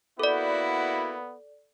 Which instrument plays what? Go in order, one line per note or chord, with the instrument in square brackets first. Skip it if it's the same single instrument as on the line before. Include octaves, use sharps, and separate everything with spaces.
[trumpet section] A#3 E4 F#4 [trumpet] B3 [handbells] A4 D5